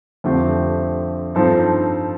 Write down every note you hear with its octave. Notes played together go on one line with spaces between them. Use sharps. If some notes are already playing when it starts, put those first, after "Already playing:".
F2 D3 A3 C4 G4
G2 F3 C4 D#4 A4